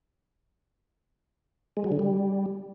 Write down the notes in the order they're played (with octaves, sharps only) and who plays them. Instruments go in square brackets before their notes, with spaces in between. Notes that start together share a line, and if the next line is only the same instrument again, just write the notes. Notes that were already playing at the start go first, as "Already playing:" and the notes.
[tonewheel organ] G#3
F#3
D3
G3